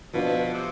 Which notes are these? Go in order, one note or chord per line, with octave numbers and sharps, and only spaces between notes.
B2 F3 B3 D4 F4
C3